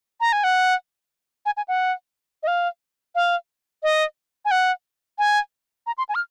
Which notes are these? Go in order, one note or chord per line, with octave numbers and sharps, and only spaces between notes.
A#5
G#5
F#5
G#5
G#5
F#5
D#5
F5
F5
D#5
G#5
F#5
G#5
A#5
C6
G#5
F6